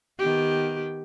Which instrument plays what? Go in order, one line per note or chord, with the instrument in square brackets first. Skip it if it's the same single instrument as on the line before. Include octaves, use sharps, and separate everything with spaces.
[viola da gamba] D#3 B3 G4